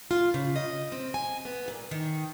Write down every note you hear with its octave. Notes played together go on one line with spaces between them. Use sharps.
F4
C#3
D#5
C4
G#5
B3
A#2
D#3